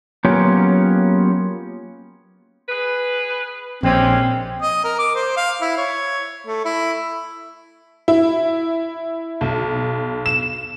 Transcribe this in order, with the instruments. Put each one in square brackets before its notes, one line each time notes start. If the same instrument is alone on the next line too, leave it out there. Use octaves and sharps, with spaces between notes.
[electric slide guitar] F#3 A#3 B3 C#4 F4 G4
[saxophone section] G#4 B4
[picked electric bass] A#1 [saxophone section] G3 G#3 C#4 [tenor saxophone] C4
[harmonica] D#5
A#4
D6
C5
F5
E4
C#5
A3
E4
[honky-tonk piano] E4
B1
E7